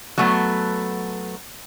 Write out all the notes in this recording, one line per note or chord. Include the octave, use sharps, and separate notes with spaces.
F#3 A3 B3